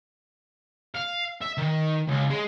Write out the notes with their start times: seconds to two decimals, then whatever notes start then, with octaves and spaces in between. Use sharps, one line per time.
0.95 F5
1.41 E5
1.58 D#3
2.07 C#2
2.30 G#3